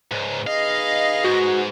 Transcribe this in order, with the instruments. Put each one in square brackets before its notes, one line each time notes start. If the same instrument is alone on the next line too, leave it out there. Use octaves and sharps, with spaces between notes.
[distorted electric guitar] C#2 G#2
[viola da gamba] D#4 G#4 B4 [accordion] D#5 [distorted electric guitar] F5
[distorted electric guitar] G#2 [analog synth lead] F#4